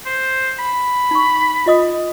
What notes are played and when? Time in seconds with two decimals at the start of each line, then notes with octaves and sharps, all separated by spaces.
0.06 C5
0.59 B5
1.11 D#4 C#6
1.66 F4 D#5 D#6